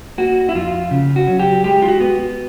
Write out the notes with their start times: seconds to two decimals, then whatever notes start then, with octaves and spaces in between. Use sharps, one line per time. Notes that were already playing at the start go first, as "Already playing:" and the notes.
0.18 A#3 F#4
0.49 E4
0.55 F2 F4
0.91 C#3
1.16 F#4
1.28 F#3
1.40 G4
1.64 G#3 G4
1.82 F4
1.88 F#4
2.00 B3